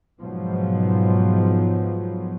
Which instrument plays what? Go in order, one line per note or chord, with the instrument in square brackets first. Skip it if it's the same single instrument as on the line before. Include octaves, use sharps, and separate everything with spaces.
[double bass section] G#2 B2 F3 F#3 B3